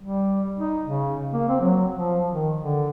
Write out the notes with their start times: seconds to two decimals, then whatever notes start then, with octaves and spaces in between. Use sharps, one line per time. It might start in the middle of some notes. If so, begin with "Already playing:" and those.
0.01 G3
0.58 D#4
0.85 C#3
1.33 A#3
1.48 C4
1.61 F#3
1.95 F3
2.32 D#3
2.57 D3